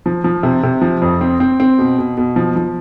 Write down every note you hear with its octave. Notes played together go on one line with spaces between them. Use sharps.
F3
F3
C3
C3
F3
F2
C4
C4
C4
B2
B2
B2
F3
F3